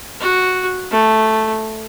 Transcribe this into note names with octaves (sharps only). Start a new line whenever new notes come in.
F#4
A3